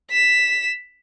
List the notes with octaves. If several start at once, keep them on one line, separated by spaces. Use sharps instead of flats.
B6 E7